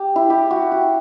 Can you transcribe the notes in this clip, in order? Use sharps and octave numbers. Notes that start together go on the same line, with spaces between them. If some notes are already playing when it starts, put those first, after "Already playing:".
Already playing: G4
E4
G4
F#4
F#4